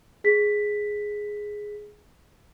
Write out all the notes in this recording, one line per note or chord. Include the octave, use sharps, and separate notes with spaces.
G#4 B6